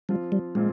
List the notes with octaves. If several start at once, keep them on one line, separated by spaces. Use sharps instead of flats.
F3 G3 C4 F4
G3
A#2 F3 G#3 C4 F4